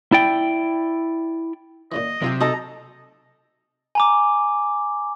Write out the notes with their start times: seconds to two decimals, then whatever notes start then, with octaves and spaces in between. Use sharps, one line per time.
0.12 E4 D5 G5
1.92 A#2 C#3 E3 D#5
2.22 B1 C3 F4 G5
2.41 D#4 F#4 A4 D#5 A#5
3.95 G#5 A#5 D6